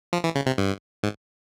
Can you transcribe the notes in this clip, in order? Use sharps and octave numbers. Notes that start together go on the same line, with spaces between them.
F3
E3
C#3
C3
G2
G#2